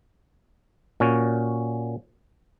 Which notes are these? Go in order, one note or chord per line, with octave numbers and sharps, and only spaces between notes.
A#2 C#4 F#4